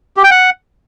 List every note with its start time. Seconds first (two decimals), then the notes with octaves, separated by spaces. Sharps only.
0.17 G4
0.24 G5
0.31 F#5